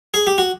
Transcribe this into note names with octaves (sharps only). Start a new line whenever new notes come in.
G#4
G4
F#4